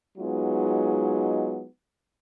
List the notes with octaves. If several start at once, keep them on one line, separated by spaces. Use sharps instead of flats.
F#3 G#3 B3 D#4 F4